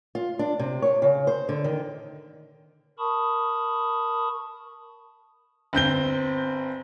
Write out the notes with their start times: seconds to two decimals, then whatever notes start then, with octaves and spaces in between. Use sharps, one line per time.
0.15 F4
0.39 D4
0.59 C3
0.82 C#5
1.02 C#3
1.27 C5
1.49 D3
1.64 D#3
2.99 A#4 A5 B5 C#6 D#6
5.73 G1 C4 G6 G7